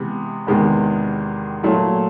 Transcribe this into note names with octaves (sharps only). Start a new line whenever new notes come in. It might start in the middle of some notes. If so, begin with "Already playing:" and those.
Already playing: C3 E3 G#3 B3
E2 C3 D#3 G#3 B3
A#2 F#3 A3